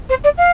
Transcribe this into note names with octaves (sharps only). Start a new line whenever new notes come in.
C5
D5
F5